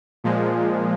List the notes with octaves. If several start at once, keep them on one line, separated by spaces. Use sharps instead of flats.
A#2 F3 G#3